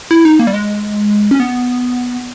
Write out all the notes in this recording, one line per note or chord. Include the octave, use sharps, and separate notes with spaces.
E4
D#4
A#3
G3
G#3
C#4
B3